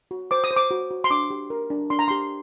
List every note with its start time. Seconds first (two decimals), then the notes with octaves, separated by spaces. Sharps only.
0.11 F#4
0.31 C5 D6
0.44 D#6
0.51 C5
0.57 D6
0.71 F#4
0.91 F#4
1.04 C6
1.10 D4 D6
1.30 G4
1.50 A#4
1.70 D4
1.90 D4 C6
1.99 A#5
2.08 G4 C6